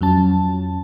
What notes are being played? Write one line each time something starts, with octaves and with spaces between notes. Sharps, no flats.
F2 F#3 C#4 A5